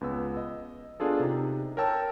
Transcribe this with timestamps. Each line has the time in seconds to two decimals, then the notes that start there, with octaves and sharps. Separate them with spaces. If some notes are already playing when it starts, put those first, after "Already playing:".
0.01 C#2 B3 E6
0.37 D#5
1.00 B3 D4 F4 G#4 A4
1.20 C3 D#4
1.77 A#4 C#5 G5 A5 E6